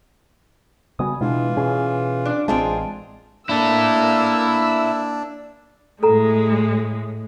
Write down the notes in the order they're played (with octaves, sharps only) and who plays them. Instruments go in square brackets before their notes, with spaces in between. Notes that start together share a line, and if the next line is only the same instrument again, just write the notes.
[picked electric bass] C#3 G3 B3 [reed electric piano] F#4 G#5 D#6
[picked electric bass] B2 [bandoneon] E3 F4 [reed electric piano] G#3 D4 E4
[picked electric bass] B2 C#4 [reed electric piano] G#4
[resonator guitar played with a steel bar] D4
[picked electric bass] A1 G#3 [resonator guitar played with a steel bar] C4 F4 G#4 [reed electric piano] A5
[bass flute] A#3 [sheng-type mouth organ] D4 [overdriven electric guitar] E4 A4 [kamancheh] E6
[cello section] A2 [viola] G#3 [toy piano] A4 A#5